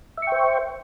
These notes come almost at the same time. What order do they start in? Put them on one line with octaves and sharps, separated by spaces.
E5 C#6 G5 C5